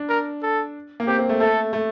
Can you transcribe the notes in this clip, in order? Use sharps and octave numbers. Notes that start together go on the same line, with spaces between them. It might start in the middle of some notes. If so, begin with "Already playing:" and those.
Already playing: D4
A#4
A4
A#3
C4 G4
C4
A3
A3 A4
A3